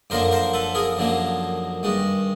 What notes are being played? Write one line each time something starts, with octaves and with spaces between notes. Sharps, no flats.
F#2 D3 F3 A#3 A#4 C5
A#4 C5
A4 B4
G#4 A#4
F#2 D3 F3 A#3
G2 D#3 G#3